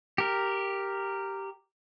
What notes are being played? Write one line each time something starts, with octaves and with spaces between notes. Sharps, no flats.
G4 A#4